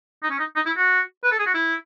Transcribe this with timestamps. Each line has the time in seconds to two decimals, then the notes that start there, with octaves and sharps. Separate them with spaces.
0.23 D#4
0.30 C#4
0.39 D#4
0.55 D#4
0.66 E4
0.77 F#4
1.23 B4
1.31 A4
1.39 G#4
1.46 F#4
1.54 E4